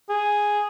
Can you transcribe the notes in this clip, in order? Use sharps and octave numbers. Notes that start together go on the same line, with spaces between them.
G#4